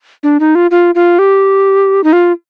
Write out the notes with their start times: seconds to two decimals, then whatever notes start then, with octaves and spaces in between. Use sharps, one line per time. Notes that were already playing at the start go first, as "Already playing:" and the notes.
0.23 D4
0.40 D#4
0.55 F4
0.71 F4
0.95 F4
1.19 G4
2.04 D#4
2.13 F4